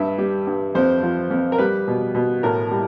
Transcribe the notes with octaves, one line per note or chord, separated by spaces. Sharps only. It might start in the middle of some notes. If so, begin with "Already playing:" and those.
Already playing: G2 E5
G3
G2
F2 C5
F3
F2
A#4
G3 B4
B2
B2
A2 A#4
G3